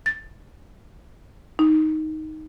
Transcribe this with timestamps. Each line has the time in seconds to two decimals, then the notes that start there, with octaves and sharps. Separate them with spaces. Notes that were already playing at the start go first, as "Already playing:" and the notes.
0.06 A6
1.59 D#4